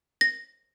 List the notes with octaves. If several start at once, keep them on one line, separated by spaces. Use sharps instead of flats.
A#6